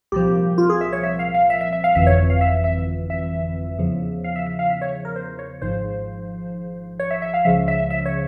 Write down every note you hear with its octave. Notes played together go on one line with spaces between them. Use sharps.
C2 A#2 F3 G4
F4
G#4
E5
C#5
E5
F5
F5
E5
E5
E5
F5
G1 F2 E3 E5
C#5
F5
E5
E5
E5
E2 C#3 F3
F5
E5
E5
F5
E5
C#5
A#4
C5
C#5
G#1 G#2 F3 C5
C#5
E5
E5
F5
C#2 C#3 F3 E5
E5
E5
C#5